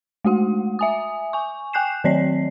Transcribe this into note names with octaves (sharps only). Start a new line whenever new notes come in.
G#3 A3 F#4 F#5
E5 G#5 D#6
G#5 C#6
G5 G#5 F#6 G6 C7 E7
D#3 F#3 C4 C#5 D5 C7